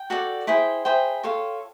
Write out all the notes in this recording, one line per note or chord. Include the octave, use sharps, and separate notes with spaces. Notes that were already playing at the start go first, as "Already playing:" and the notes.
Already playing: G5
F#4 A4 D5
E4 G#4 C5 G5
E4 G#4 C5 G5
F4 A4 C#5